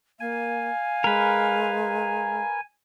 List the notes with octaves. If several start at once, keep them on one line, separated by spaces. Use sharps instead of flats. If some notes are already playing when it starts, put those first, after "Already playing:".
A#3 F5 G#5
G#3 A#4 B4